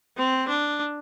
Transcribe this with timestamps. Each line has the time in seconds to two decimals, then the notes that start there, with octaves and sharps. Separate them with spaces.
0.18 C4
0.49 D4